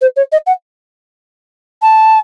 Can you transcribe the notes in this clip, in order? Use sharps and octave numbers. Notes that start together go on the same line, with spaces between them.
C5
C#5
D#5
F#5
A5